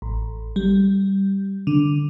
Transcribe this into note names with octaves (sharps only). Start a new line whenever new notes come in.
A1
G3
D3